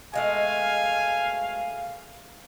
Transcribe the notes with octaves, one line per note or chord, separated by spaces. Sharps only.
B2 G#3 A3 F5 G#5